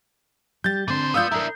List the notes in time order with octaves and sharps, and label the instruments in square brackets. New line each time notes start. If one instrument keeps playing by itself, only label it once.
[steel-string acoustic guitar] G3 G4 [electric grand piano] G6 A6
[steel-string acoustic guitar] D3 C4 [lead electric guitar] E3 C5
[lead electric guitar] B3 [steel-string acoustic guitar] F4 D5 F5 [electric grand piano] D#6 E6 G6
[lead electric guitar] D4 E4 [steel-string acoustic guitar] A#4 A#5